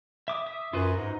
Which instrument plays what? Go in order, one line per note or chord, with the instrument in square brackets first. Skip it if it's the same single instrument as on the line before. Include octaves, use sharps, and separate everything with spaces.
[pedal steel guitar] E5 D6 D#6
E5 D#6
[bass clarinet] F#2 [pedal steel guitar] F4 F#4 B4
[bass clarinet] G#2 [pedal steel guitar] D#4